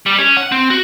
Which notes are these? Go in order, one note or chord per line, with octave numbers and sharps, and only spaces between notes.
G3
C#4
F#5
C4
F#4